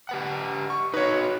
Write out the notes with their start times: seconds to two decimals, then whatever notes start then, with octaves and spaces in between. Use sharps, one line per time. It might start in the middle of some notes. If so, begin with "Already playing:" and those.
0.09 G4 B4 F#5
0.70 C#6
0.94 D#4 F#4 B4 C#5